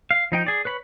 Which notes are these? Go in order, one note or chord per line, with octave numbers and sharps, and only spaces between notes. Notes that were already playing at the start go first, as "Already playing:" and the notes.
F5
F3 D#4 G5
G#4 D5
B4 C#5 B5